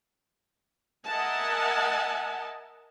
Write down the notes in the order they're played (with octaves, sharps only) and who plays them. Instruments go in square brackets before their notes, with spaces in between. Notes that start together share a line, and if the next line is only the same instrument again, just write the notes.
[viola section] A#4 D#5 E5 F#5 G#5 A5